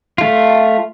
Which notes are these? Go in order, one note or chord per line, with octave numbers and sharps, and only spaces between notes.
A3 F4